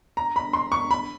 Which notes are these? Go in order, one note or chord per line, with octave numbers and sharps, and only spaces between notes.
A#5
B5
C6
C#6
B5